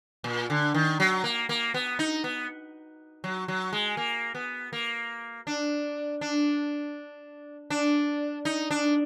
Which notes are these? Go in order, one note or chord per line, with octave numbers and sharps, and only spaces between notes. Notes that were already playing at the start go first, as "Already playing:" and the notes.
A#2
D3
D#3
F#3
A#3
A#3
B3
D#4
B3
F#3
F#3
G#3
A#3
B3
A#3
D4
D4
D4
D#4
D4